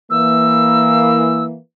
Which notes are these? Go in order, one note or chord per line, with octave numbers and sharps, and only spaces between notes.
E3 A#3 E6